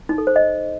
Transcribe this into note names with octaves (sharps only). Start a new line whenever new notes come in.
D#4
A4
C5
D#5